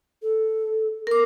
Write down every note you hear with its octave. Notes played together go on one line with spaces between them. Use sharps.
A4
A#4 D6